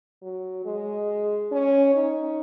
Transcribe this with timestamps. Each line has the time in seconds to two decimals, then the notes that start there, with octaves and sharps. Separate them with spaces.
0.23 F#3
0.65 G#3
1.52 C#4
1.95 D#4